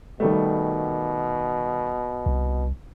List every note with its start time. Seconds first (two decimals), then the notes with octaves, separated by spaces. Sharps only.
0.20 B2 D#3 G3 A3
2.26 C2